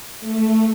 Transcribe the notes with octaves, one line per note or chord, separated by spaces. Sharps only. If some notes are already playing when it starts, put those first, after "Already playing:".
A3